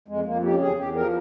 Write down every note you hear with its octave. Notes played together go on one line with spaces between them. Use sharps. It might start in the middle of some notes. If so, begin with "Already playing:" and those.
F2 G#3
F2 A#3
C#3 G4
E2 G#4
E2 G4
F3 A#4